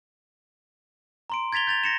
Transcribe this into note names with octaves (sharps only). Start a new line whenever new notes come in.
A#5 C6 D7
G#6 A6 B6 F7 G7
G6 A6 F7
A#6 C#7 E7